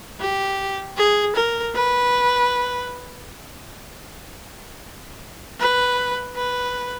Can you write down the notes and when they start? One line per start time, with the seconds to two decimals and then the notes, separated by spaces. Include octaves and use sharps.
0.21 G4
0.97 G#4
1.36 A#4
1.75 B4
5.60 B4
6.35 B4